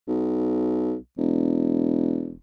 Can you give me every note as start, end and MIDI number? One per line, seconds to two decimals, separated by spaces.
0.08 0.95 35
1.18 2.37 28